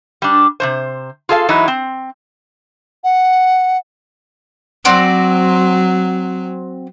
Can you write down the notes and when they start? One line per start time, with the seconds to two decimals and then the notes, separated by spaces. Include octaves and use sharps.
0.22 G3 D4
0.60 C3 D#3 C5
1.29 F4 G#4 A4 E5 F5
1.49 E3 F#3 G#3 D#4 E4
1.68 C4
3.04 F#5
4.85 F#3 C4 F#4 D5